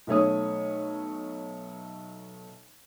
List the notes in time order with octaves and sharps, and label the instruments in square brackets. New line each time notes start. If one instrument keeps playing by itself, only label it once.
[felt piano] B1 A3 C#5 D#6